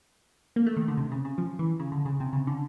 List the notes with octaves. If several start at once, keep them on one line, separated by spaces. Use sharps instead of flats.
A#3
A3
D#3
D3
C3
C#3
C#3
F3
E3
C#3
D3
C#3
C3
C#3
D3